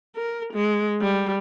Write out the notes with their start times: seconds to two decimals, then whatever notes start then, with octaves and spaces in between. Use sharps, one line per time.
0.16 A#4
0.54 G#3
1.01 G3